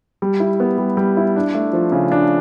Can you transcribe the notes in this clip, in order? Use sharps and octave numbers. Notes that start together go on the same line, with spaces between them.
G3
E4
B3
G3
G3
E4
D4
A3
F3
C#3
D4